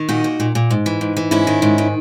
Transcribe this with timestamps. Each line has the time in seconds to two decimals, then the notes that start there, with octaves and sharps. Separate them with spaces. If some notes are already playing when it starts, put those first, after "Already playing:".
Already playing: D#3
0.09 A#2 D#4 F#4
0.24 A#2
0.40 A#2
0.55 A#2
0.71 G#2
0.86 E3
1.01 G#2
1.17 E3
1.31 G#2 C#4 E4
1.47 D#3
1.62 G#2
1.78 D#3